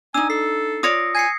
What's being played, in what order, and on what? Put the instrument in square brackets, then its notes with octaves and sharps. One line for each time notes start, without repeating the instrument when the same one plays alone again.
[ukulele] D4 D#4 [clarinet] G#5 [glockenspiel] E6
[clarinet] A4 [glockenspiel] C7
[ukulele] F4 C#5 D5 [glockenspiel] D#6 A#6 C#7
[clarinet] G#5 [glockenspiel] G#6 C7 C#7